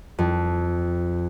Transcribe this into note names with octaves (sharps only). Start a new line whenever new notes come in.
F2